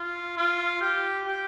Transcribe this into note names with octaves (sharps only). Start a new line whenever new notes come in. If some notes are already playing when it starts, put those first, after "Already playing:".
Already playing: F4
F4
G4
G4